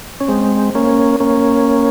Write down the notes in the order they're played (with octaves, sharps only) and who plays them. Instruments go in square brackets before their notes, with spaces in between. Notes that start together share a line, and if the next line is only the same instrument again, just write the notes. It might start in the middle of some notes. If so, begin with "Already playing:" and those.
[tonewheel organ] C#4
G#3 C4
A#3 C#4
A#3 C#4